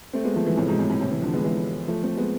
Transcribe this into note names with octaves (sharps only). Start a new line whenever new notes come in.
A3 C4
G#3 B3
F3 A3
E3 G#3
A2 C3
G#2 B2
A2 C3
A2 C3
A2 C3
C3 E3
D3 F3
G#3 B3
E3 G#3
F3 A3
A3 C4
G#3 B3